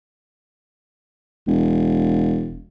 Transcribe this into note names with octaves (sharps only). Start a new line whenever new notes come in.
E1